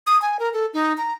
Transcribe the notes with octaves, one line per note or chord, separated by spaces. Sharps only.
D#6
G#5
A#4
A4
D#4
A#5